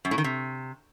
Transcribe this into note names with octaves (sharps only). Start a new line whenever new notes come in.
F#2
A2
D#3
C3